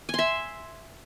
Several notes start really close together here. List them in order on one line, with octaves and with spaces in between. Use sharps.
G#5 C6 E5